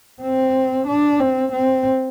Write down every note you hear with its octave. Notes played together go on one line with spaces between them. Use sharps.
C4
D4
C4
C4